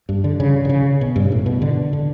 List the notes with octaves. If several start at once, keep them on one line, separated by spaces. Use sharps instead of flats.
G2
D3
C#3
D3
C#3
B2
G2
A2
B2
D3
D3